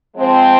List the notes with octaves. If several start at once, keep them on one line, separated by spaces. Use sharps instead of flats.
F3 G#3 C4